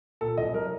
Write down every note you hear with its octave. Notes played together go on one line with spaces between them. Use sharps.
A#2 A4
C2 D#5
F#3 A#4